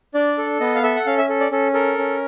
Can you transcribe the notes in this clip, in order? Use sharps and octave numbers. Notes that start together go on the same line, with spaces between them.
D4 D5
A4
B3 D#5
F5
A4 E5
F#5
C#4 F5
E5
A4
D5
C#4 A4
A4 A#4
C#4